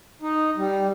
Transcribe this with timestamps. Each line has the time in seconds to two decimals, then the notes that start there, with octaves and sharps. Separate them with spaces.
0.22 D#4
0.57 G3